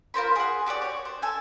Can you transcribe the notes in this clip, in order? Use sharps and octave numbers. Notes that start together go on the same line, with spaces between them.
F4 A#4 C5 B5
G#4 F#5
F#4 G4 A4 D5
C#5
C5
A4 G#5